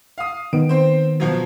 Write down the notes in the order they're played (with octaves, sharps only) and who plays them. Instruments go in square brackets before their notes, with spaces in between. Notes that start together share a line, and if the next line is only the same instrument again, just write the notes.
[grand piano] F5 D#6
[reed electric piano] D#3 B3 [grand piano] D7
[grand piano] C4 C5
B2 F3 F#3